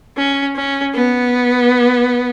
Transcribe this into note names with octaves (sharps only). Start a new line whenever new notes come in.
C#4
C#4
B3